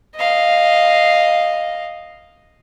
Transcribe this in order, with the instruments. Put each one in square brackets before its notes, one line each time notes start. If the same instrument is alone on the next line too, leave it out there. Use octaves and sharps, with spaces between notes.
[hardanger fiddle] D#5 F5